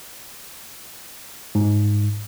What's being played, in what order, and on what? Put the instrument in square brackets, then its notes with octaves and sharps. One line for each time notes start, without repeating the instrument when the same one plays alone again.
[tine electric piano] G#2